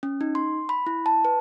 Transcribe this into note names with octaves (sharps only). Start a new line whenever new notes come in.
C#4
D#4
C6
B5
E4
A5
B4